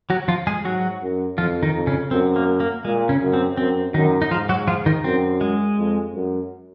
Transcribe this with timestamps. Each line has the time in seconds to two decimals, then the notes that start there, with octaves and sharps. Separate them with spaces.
0.10 F#3 F#4
0.28 F3 F4
0.47 G#3 G#4
0.65 G#2 F#3 F#4
1.02 F#2
1.38 F2 F3 F4
1.63 D#3 D#4
1.74 F2
1.87 C#3 C#4
2.11 F#2 C4
2.36 A#3
2.60 A#3
2.85 A#2 G#3
3.09 C#3 C#4
3.21 F#2
3.34 C4
3.57 F#2 C4
3.94 F#2 D#3 D#4
4.22 D#4
4.31 G#2 F3 F4
4.49 F#3 F#4
4.68 F3 F4
4.86 D#3 D#4
5.04 F#2 C4
5.41 G#3
5.78 F2
6.14 F#2